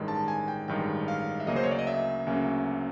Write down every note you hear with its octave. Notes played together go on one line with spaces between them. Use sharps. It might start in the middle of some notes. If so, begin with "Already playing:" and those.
Already playing: A1 G2 D#3 G#3
A5
G#5
G5
A1 G2 D#3 G#3 G5
F5
E5
D2 C#3 F#3 A#3 C#4 D#5
C5
C#5
D5
D#5
E5
D2 C#3 F#3 A#3 C#4